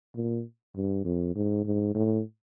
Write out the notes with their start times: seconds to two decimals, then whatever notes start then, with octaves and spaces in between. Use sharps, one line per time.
0.16 A#2
0.76 G2
1.05 F2
1.35 G#2
1.65 G#2
1.95 A2